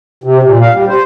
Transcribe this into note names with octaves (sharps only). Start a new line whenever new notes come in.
C3
A#2
F5
G3
C5